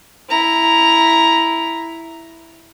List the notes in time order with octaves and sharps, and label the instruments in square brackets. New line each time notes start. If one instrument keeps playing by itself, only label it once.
[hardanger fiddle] E4 A#5